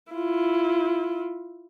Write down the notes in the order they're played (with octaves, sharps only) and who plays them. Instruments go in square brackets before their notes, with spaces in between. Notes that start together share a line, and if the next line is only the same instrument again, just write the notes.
[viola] E4 F4